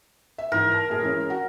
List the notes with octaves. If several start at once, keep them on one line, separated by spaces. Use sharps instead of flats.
E5
G#2 E3 A#4
A5
F#1 A2 G#4
E3 G#3 C#4
F#4